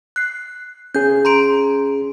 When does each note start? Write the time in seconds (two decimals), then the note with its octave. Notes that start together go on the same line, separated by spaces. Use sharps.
0.16 F#6 C7
0.95 C#4 G#4 G6
1.25 A#5 C6 D7